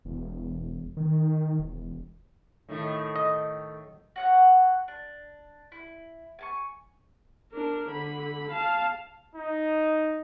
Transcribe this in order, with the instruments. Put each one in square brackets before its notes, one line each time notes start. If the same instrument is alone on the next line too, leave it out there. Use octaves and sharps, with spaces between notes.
[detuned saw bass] E1
D#3
E1
[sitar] A2 D#3 A3
[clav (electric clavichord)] D#5
[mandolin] F#4 C#5 F#5
D4
E4
G#5 A5 C#6
[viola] D4 A#4
D3 B5
F5 A5
[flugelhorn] D#4